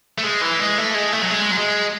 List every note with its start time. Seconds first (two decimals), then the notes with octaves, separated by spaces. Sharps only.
0.18 A3
0.23 G#3
0.41 E3
0.60 G#3
0.78 A3
0.94 G#3
1.13 A3
1.23 F#3
1.31 G#3
1.52 F#3
1.58 G#3